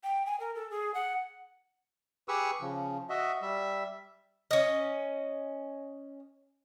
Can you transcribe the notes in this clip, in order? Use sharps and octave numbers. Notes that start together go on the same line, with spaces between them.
G5
G#5
A#4
A4
G#4
F#5
G4 G#4 B4 C#6 D#6 E6
C#3 F3
F#4 D#5 E5
G3 E5
C#4 D#5